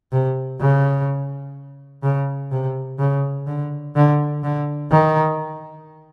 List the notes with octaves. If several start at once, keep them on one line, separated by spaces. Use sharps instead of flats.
C3
C#3
C#3
C3
C#3
D3
D3
D3
D#3